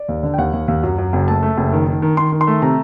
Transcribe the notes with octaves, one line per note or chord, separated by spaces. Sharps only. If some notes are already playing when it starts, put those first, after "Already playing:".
Already playing: D5
D#2
D3
G5
D#2 F#5
D#2
D#2
F#2
F#2
F#1
A3 A5
A3
F#1
D#3
D#3
D#3
D#3 C6
D#3
C6
A3
C3 A#5